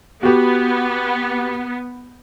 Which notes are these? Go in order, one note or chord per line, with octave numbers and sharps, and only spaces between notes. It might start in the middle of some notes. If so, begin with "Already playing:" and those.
B3 F#4 G4